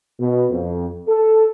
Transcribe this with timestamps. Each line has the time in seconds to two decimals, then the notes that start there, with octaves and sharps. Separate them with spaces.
0.20 B2
0.50 F2
1.08 A4